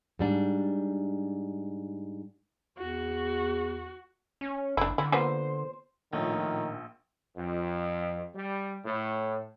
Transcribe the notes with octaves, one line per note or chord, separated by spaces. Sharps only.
G#2 G3 D4
E2 F#4
C#4
F#1 D4 E4
D3 E4
A#3 B3 F4 C5
A#1 A2 D#3 F3
F2
G3
A2